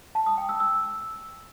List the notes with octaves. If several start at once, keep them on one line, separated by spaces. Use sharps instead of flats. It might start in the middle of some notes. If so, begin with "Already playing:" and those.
A5
D#6
G5
E6
E6